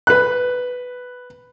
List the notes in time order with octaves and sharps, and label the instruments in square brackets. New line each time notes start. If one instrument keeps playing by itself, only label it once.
[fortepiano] B4 F#6